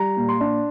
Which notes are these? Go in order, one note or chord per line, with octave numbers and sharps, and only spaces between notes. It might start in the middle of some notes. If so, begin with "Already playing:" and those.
Already playing: G3 A#5
A#2
C6
D4